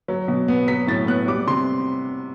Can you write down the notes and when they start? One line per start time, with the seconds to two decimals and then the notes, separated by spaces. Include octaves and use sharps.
0.08 F#3
0.28 B2
0.48 B3
0.68 F#3 B6
0.87 A2 A6
1.07 B3 F#6
1.28 G3 D6
1.47 C3 C6